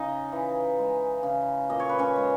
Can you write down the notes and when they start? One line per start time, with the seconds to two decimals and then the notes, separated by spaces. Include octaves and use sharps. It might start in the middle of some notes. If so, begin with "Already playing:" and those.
Already playing: C#3 D#4 D#5
0.32 E3
0.78 G#3
1.23 C#3
1.70 A#2 D#5
1.80 C#5
1.89 B4
1.98 C#4 C#5
2.16 G#3